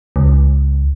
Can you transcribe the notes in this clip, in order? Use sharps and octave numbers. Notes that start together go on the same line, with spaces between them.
C#2